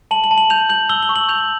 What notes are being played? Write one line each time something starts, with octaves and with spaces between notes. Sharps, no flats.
A5 F#7
F#7
A5
F#7
G6 F7
G6 F#7
E6 G7
G7
C#6
F#7
G6 F7